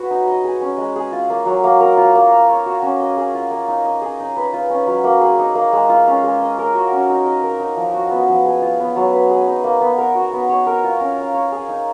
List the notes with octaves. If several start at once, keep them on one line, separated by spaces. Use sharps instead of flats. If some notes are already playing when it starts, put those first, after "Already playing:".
Already playing: C#4 F#4 B4
D#4
D#5
G#4
C#4
G#3
G#4
F4
A#3
F#3
A#3
A#4
F4
A#3
F5
C#5
F#4
C#4
D#5
G#4
F4
A#3
D#4
D#5
G#4
D#4
B4
F4
C#4
F#3
A#3
G#4
D#4
A#3
G#3
F4
C#4
G#3
D#5
A#4
F#4
C#4
D#4
D#5
A#4
D#4
F3
F#4
B3
F3
G#4
F4
B3
F#3
B4
G#4
D#4
A#3
B3
A#4
F#4
B3
C#5
A#4
F4
C#4
F5
C#5
G#4
D#4